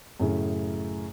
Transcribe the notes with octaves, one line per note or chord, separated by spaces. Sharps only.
F#2 A2 C#3